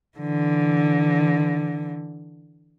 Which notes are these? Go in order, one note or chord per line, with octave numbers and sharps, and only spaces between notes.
D3 E3